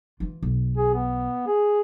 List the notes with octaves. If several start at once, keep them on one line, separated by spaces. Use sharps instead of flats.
E3 F4
B1
G#4
B3
G#4